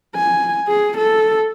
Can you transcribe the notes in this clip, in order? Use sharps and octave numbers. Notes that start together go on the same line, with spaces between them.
G#5
G#4
A4